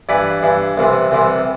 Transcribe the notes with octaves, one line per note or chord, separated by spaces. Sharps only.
G2 E3 B4 D5
G2 E3
C2 C3 E3
C2 C3 E3